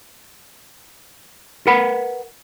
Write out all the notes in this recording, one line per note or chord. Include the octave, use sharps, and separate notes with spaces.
A#4 B4 F#5 B5